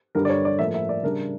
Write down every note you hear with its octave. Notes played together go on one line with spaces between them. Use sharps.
G2 D3 G3 A#4
D5
C#5
D5
A2 F3 A#3 E5
E5
D5
C#3 G3 D4 A#4